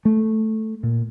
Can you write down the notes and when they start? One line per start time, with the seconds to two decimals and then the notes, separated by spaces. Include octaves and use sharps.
0.05 A3
0.83 A#2